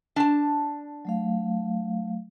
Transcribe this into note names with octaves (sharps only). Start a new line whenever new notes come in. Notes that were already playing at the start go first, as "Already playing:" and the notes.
D4 A5
F#3 A3 F5